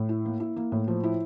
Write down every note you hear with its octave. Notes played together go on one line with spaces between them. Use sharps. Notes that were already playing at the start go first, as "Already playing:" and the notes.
Already playing: A2
E4
A#3
E4
A#3
A2
F3
E4